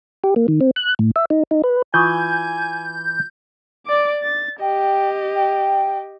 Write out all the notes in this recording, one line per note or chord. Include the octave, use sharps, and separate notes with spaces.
G4
A#3
D#3
C4
F#6
A2
E5
D#4
D#4
B4
E3 F4 G#5 C#6 D#6 G6
D5 D6
A6
G4 D#5 G5
G5